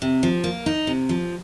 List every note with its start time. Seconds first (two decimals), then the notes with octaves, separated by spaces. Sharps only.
0.02 C3
0.23 F3
0.44 A#3
0.66 D#4
0.87 C3
1.09 F3